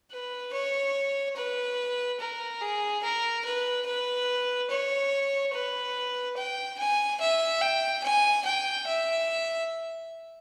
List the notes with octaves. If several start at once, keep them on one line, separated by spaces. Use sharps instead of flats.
B4
C#5
B4
A#4
G#4
A#4
B4
B4
C#5
B4
G5
G#5
E5
G5
G#5
G5
E5